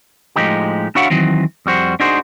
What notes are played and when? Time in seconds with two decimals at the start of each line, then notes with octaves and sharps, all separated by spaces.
0.36 A2 F3 G#3 D#4 G4
0.95 D4 E4 F#4 C#5 F5 F#5
1.10 D#3 E3 F#3 C4
1.66 F2 G3 F#4 C5
2.00 D4 D#4 F#4 G#4 C5